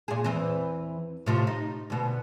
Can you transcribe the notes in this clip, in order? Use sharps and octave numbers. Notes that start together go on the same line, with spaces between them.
A#2 G#4
E2 E3 C4
A2 C3 F3
D#4
D2 B2